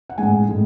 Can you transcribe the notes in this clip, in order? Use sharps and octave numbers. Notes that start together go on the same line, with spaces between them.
F#5
A2 G#3 G#5
A2 G#3